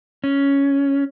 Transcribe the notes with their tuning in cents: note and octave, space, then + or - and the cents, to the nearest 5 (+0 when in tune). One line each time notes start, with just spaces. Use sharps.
C#4 +5